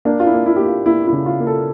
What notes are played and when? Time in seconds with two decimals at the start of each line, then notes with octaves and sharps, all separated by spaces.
0.05 A#3 D4
0.20 F4
0.27 E4
0.33 A#3
0.46 E4
0.56 A#3 G4
0.67 F4
0.86 A#3 E4
1.07 E4
1.13 C#3
1.26 F4
1.40 A#3
1.47 A4